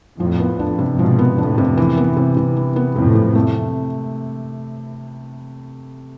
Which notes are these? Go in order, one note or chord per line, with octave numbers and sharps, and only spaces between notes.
F2 A2 F3
B3
F2 D4
C3
G#2 B2 F3
B3
F2 A2 D4
C3
E3
B3
C3
C3
E3
B3
F2 A2 C3
C3
A3